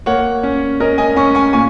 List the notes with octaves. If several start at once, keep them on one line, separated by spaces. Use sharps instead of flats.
A#3 C#5 F#5
C#4
C#4 A#4 D#5
D#5 G#5
C#4 G#5 C#6
G#5 C#6
A#2 G#5 C#6